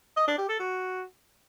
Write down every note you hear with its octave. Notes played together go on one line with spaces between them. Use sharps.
D#5
D4
G4
A4
F#4